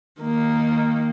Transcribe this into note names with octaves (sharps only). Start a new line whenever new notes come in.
D#3 A#3